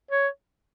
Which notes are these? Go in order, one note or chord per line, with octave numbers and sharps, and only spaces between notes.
C#5